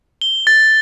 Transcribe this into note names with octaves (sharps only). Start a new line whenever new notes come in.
G7
A6